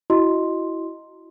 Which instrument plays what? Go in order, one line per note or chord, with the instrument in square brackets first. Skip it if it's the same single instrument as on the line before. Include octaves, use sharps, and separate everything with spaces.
[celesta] E4 F#4 D#5 C6